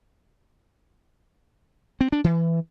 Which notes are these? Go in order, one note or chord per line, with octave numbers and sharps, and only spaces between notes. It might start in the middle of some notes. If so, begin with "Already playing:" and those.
C4
D4
E3